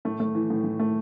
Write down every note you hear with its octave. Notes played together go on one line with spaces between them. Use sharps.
A2 A3
A3
E3
A2
A2
A3